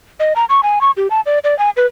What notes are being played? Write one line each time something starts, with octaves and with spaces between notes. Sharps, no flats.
D#5
A#5
C#6
G#5
C#6
G4
A5
D5
D5
G#5
B4